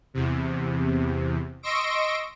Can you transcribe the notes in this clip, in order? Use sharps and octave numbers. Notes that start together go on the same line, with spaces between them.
E2 C3
D#5 C6 C#6 E6 A#6 D7